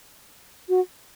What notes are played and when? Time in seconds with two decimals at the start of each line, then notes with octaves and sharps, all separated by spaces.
0.69 F#4